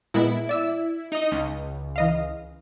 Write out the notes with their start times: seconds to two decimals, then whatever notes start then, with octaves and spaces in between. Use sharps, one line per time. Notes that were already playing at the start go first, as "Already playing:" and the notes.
0.14 A#2 G#3 B3 E4
0.49 D5 E5 E6
1.12 D#4 D#5
1.32 C#2
1.96 E3 D#5 F5